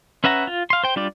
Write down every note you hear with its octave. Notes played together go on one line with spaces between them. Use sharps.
C#4 B4 E5 F#5 A#5
F4
F5 C6
C5 G5
G3 D4 F4 G4 D5